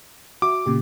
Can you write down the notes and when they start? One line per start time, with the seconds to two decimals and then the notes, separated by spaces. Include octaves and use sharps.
0.42 F#4 E5 D6
0.66 A#2 C#3 G4